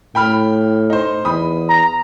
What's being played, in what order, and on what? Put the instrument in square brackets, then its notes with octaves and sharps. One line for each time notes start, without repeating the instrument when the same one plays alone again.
[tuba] A2 [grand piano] G5 B5 F6
[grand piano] D#4 C5
[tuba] E2 [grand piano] B5 D#6
[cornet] A#5